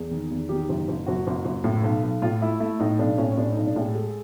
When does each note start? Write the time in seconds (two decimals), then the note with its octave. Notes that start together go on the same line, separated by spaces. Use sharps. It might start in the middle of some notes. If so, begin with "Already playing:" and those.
Already playing: E2 G#4
0.11 D#3
0.31 E2
0.49 D#3 G4
0.69 F#1
0.88 F#1
1.06 F#1 F#4
1.27 F#1
1.45 F#1
1.64 A2
1.84 B1
2.02 B1
2.22 A2 F4
2.42 A3 E4
2.60 A3 E4
2.79 A2 D#4
2.99 B1 D4
3.18 A2 C#4
3.32 C#4
3.37 A2 D4
3.52 B1 D#4
3.67 D4
3.76 A2 G#4
3.95 G#3 A4